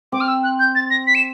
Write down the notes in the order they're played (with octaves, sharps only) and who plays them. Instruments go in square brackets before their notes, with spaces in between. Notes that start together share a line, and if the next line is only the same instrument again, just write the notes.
[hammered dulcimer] C4 [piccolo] D6
[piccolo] F6
E6
F#6
G6
A6
A#6
B6
E7